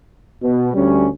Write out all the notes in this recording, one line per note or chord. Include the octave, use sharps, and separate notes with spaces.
B2
D2 G3 C#4